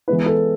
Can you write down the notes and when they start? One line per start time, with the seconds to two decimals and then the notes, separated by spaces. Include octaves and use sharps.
0.08 E3 G#3 B3 E4 B4
0.26 A4